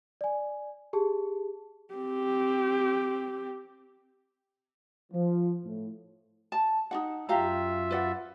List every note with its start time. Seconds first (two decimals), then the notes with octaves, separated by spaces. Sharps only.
0.21 D5 G#5
0.93 G4 G#4 A5
1.94 C4 G4
5.12 F3
5.64 A2
6.52 A5
6.91 D#4 F#4 F#5
7.29 F#2 F4 G4 E5 F5 A#5
7.91 B4 D5 F#5